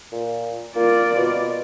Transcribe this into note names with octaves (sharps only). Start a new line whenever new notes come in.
A#2
A#3 F4 D5
B2